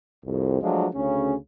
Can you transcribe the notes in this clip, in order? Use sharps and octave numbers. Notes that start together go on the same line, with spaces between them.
C2 F2
F3 F#3 G#3 A3 D4 F4
D2 C#3 C#4